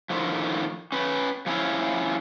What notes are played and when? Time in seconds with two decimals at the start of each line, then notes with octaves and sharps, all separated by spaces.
0.10 A2 D3 D#3 F3
0.92 C#4 B4
1.46 F3 A3 C#4 E4 C#5 F5